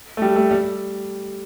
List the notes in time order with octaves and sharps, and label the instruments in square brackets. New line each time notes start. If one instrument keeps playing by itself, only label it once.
[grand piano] A3
G3
A3
G3